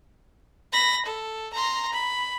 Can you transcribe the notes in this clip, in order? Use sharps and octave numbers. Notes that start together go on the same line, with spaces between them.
B5 A#6
A4
A#5 C6
B5